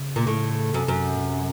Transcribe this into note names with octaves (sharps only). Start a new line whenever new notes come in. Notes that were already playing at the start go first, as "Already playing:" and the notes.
Already playing: C#3
A#2
A2
F#2 C3
F#2
A#2
C3